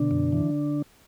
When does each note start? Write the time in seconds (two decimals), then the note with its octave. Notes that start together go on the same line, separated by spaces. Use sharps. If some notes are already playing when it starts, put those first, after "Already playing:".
Already playing: B2 D3 D4
0.11 F#2
0.32 E3